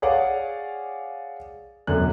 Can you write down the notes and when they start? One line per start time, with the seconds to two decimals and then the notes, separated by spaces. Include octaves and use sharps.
0.02 G#4 C#5 D5 F5 F#5
1.87 E1 F#2 D3 G#5 F#6